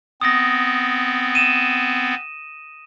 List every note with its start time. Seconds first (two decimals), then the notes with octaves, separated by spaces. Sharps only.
0.21 B3 C4 D#6 A#6
1.35 D#7 E7